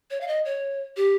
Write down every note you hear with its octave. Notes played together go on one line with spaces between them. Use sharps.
C#5
F5
D#5
C#5
G4